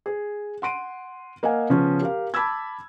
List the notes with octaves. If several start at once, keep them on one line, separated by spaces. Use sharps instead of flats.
G#4
F#5 C6 D7 D#7
A#3 D#5 F5 F#5 G#5
C#3 F3 B3 C#4
G4 A#4 F5
A5 B5 D6 E6 G#6